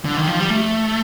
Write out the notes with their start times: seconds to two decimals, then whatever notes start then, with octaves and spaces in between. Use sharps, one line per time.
0.05 D3
0.17 D#3
0.28 F3
0.39 G3
0.50 A3